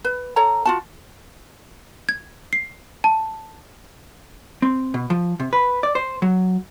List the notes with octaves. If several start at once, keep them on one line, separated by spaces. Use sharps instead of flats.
B4
A4 C#5 A#5
F4 F#4 A5
G#6
C7
A5
C4
B2
F3
C3
B4
D5
C5
F#3